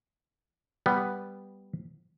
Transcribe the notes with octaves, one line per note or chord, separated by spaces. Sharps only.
G3 B3